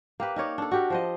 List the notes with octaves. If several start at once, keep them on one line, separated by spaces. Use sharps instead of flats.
A#3 G4 B4
D#4 A#4 C#5 D5
D4 A4
F#4 G4 A#4
F3 C5 D#5